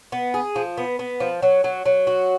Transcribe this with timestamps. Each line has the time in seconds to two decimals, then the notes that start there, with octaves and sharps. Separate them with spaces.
0.12 B3
0.34 G#4
0.56 F3
0.78 B3
0.99 B3
1.20 F3
1.42 F#3
1.64 F#3
1.86 F#3
2.07 F#4